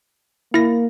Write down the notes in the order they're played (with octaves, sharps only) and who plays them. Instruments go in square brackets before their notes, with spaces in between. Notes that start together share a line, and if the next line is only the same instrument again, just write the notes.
[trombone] A#3 [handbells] E4 A#6